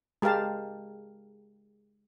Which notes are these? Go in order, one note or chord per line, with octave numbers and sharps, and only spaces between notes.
G#3 G4 A#4 F5 A5